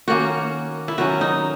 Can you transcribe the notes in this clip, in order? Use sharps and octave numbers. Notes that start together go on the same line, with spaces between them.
D#3 A#3 C#4 F#4
E4
D#3 F#3 C#4 F#4
D#4